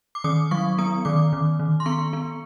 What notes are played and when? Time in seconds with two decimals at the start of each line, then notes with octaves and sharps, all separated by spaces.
0.15 D6
0.24 D#3 D#6
0.51 F#3 C#6
0.78 B3 D#6
1.05 D#3 D6
1.33 D#3
1.59 D#3
1.80 C6
1.86 B3 C#6
2.13 B3